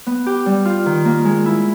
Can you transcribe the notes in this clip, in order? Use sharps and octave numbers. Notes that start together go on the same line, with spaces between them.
B3
G4
G3
F4
D#3
A#3
G#3
E4